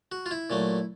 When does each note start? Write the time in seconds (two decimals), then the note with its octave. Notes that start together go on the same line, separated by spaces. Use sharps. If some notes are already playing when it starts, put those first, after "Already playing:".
0.12 F#4
0.26 F4
0.31 E4
0.50 A#2 F#3 A3